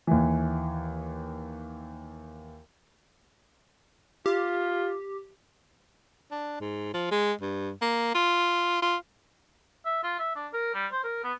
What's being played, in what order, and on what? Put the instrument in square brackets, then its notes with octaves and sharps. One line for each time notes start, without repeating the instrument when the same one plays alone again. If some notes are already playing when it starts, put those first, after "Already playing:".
[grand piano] D#2 E3
[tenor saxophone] F4 [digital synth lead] G4
[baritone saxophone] D4
G#2
F3
G#3
G2
A#3
F4
F4
[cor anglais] E5
F4
E5
D4
A#4
G3
C5
A#4
B3